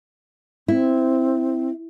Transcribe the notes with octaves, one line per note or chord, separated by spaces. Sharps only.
C4 E4